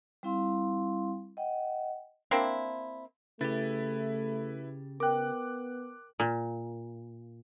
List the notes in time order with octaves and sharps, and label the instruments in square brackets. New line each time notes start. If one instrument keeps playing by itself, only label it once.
[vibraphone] G3 C4 E4 F5 C6
D#5 F#5 G5
[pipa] A#3 C4 D4 E4
[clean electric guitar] C#3 G4 [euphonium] A3 [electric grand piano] E4 B4 A6
[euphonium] B3 [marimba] A#4 G5 [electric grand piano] D6 F#6
[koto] A#2